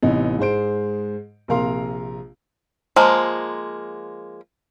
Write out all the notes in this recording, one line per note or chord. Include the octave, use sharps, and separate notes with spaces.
A1 C3 B3 D#4
G#2 G#3 C5 D7
A#1 C3 A#4 F5 C6
F3 G#3 A#3